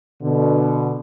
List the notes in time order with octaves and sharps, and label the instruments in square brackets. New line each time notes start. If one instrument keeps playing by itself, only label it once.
[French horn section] B2 D3